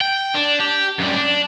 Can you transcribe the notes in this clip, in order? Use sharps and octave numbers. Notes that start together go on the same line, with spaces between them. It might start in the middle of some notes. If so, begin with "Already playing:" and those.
G5
D4
G4
F#2 G3
D4